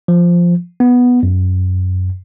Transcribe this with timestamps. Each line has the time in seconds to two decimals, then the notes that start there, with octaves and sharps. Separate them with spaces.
0.08 F3
0.80 B3
1.23 F#2